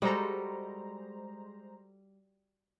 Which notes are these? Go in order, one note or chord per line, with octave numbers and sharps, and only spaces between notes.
G3 G#3 F#4 A4 C5 A#5